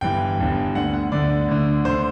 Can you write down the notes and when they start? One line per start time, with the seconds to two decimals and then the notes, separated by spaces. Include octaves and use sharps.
0.01 G1 G2 E3 G5
0.38 G1 G2 E3
0.75 D2 D3 F#5
0.94 F#5
1.12 D2 D3 D5
1.48 D2 D3
1.85 D2 D3 C5